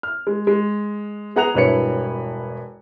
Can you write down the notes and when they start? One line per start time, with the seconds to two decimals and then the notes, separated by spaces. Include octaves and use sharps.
0.03 F6
0.27 G#3
0.47 G#3
1.36 B3 G#4 F#5 A#5 F#6 F7
1.54 E1 G2 E4 B4 C#5 C#7